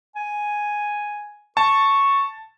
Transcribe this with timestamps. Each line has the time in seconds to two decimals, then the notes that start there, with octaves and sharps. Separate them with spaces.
0.16 G#5
1.57 A5 C#6